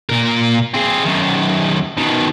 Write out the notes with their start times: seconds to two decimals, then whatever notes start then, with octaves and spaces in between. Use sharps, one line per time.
0.09 A#2 A#4
0.74 C4 G#4
1.05 F#2 D#3
1.97 B2 D#3